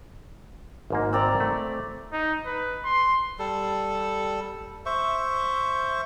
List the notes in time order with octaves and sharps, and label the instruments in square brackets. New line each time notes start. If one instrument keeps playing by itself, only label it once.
[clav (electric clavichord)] G#1 G#2 A#3
[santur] C4 D5 A#5
[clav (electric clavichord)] A3
[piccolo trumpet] D#4
B4
C6
[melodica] G3 A4
C5 E5 C#6